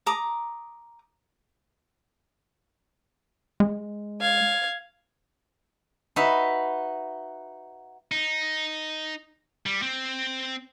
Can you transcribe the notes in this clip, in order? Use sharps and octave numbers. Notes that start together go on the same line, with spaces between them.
A#5 D6 D#6
G#3
F5 G#6
D#4 F#4 B4 E5
D#4
G3
C4